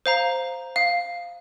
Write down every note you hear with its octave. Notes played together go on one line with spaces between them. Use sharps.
C5 F5 A#5
F5